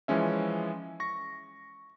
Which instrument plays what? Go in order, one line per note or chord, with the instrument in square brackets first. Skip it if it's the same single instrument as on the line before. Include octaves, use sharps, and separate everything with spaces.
[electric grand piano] E3 F3 G#3 C#4 E5
C#6 A#6